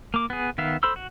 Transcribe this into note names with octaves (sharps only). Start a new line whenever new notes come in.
A#3 D6
B3 G#4
D#3 B3 E5 F5
A4 C5 B5 C6 E6
F#4